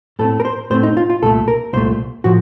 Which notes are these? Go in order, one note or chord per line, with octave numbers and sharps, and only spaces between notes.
A2 A3 C4 A4
A#4
C5
A2 A3 C4 C5
D#4
F4
F4
C2 A#2 A3 A4
A#4
C2 A#2 A3 C5
A2 F3 F#4